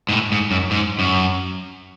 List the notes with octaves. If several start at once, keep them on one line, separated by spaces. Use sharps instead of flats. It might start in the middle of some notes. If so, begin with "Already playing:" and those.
G#2
A2
G#2
F#2
G#2
F#2